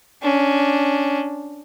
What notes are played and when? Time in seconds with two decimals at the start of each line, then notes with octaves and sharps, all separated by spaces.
0.22 C#4 D4